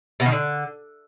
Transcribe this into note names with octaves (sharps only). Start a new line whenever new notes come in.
B2
D#3
D3